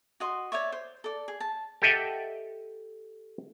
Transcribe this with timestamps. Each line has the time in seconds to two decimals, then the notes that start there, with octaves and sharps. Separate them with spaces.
0.20 F#4 D#5 C6
0.52 C#5 D5 E5 C#6
0.72 C5
1.04 A4 D5
1.28 G#4
1.40 A5
1.82 G4 A4 D#5 E5 F#5